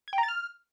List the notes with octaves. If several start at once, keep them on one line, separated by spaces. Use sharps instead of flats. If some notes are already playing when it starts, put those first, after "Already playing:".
G#6
G5
A#5
A6
F6